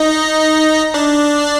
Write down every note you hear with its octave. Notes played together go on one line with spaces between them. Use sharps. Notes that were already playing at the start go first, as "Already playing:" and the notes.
Already playing: D#4 D#5
D4 D5